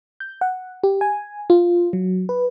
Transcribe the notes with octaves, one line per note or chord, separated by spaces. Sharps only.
G6
F#5
G4
G#5
F4
F#3
B4